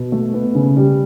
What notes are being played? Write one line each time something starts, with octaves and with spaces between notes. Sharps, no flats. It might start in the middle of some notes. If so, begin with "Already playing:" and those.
Already playing: B2
A3
B3
C#3
G3